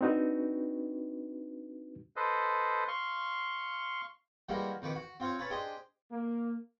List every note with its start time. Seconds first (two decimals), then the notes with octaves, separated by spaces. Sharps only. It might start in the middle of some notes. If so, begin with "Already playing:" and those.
0.01 C4 D4 D#4 F#4 B4
2.16 A4 B4 C5 D#5
2.88 F5 C6 C#6
4.49 E3 G3 G#3 A#3 F#4 A#4
4.82 F2 D#3 B4 C#6 D6
4.95 F#4
5.20 C4 F4 C5 C#5
5.39 C#4 B4 C#5 A5 B5
5.50 D4 G4 G#4 C5 D#5
6.11 A#3